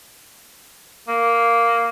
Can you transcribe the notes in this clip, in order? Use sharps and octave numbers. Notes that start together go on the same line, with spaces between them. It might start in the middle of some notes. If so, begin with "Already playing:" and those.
A#3